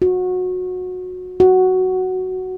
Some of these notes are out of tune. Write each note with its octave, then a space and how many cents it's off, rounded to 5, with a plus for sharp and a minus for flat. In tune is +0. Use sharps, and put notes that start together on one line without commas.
F#4 -20
F#4 +5